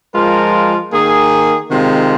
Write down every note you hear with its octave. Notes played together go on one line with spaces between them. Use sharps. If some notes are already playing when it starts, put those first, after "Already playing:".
F3 G#3 F4 A#4
D#3 A#3 G#4
C3 D#3 G#3 F4